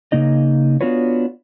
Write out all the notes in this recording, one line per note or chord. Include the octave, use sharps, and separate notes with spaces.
C#3 A#3 D#4 D#5
B3 D4 F4 F#4 B4 C#5